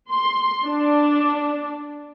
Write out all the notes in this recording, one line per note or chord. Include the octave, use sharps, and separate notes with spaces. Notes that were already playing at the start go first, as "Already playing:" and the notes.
C6
D4